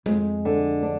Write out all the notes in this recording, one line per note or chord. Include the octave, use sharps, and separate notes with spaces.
F2 G#3
D3
D4